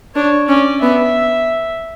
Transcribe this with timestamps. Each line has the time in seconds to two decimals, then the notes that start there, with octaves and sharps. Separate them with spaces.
0.15 D4 C#5
0.48 C#4 D5
0.82 B3 E5